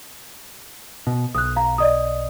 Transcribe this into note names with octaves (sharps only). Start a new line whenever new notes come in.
B2
B1 D#6 F#6
F5 A#5
D5 D#5 D#6